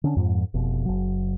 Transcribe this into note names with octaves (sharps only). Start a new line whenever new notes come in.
D3 C#4 D4
F2 G#2 F3
F1 B2
F#1 F#3